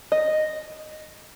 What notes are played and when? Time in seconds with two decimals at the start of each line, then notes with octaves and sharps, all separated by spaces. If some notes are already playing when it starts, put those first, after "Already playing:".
0.12 D#5